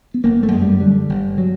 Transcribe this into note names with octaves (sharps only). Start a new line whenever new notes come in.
B3
G1 A#3
A3
F#2 G#3
G3
D3 G3
G1
F#3